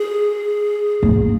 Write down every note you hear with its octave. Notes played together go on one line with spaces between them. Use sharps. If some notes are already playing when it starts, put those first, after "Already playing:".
Already playing: G#4
A#3